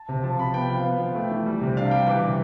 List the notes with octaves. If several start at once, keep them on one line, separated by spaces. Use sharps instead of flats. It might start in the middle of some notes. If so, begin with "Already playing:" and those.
Already playing: A5
C3
F3 A5
C3 B5
B3 G5
F3 F5
B3
F3
A3 G5
E3
G3
C3
D4 F5
G3 G5
E3 D6
C3